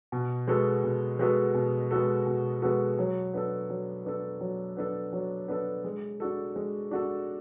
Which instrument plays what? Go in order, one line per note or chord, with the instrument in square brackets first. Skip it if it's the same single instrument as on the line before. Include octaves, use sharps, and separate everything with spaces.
[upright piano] B2
G#3 B3 F#4 A4
B2
G#3 B3 F#4 A4
B2
G#3 B3 F#4 A4
B2
G#3 B3 F#4 A4
F#3
B3 D4 A4
F#3
B3 D4 A4
F#3
B3 D4 A4
F#3
B3 D4 A4
G#3
D4 F#4 A4
G#3
D4 F#4 A4